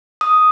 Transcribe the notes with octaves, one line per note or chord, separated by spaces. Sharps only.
D#6